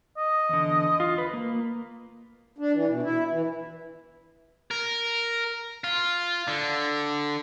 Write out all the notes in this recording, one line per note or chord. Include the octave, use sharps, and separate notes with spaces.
D#5
E2 D3
F4
B4
A#3
D4
E3
B2
E4
E3
A#4
F4
D3